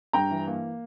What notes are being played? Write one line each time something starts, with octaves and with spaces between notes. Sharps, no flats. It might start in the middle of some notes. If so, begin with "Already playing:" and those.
G2 G5 A#5
E3
A#3